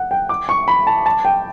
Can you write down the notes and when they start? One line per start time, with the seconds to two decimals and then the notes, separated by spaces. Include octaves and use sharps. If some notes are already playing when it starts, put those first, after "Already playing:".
Already playing: F#5
0.11 G5
0.29 D6
0.49 C#6
0.68 B5
0.87 A5
1.06 A5
1.25 G5